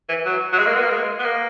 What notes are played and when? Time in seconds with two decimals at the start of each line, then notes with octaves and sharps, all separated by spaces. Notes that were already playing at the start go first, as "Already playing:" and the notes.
0.08 E3
0.25 F#3
0.53 F#3
0.58 G#3
0.66 A#3
0.74 B3
0.82 A#3
0.90 G#3
1.19 B3
1.24 A#3